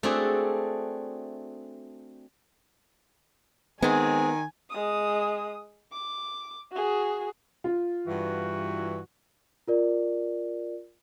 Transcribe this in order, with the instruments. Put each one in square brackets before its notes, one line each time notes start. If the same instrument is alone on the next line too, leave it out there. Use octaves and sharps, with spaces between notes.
[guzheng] A3 C4 D4 F#4 G#4 A4
[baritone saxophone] D#3 [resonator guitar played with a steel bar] G#3 C4 [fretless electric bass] B3 [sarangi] G#5
[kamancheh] G#3 D#6
D6
F#4 G#4
[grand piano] F4
[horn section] G2 E3 F#4
[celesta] F4 A#4 D5